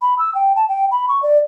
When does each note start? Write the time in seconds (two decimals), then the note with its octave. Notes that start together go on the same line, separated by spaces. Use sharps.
0.02 B5
0.19 E6
0.35 G5
0.56 A5
0.69 G5
0.91 B5
1.09 C#6
1.23 D5